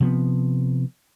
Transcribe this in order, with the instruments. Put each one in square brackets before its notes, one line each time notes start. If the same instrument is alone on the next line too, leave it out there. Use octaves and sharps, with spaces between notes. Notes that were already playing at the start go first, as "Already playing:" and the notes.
[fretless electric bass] C3 F3 B3